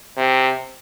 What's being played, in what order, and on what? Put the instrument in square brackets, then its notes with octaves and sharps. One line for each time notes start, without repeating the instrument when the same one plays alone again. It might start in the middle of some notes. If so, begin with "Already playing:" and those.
[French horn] C3